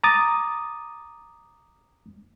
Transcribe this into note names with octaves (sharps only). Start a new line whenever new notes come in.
A#5 D6 D#6 A6